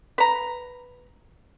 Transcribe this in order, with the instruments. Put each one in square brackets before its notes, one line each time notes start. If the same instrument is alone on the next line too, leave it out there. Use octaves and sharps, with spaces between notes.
[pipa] B4 A#5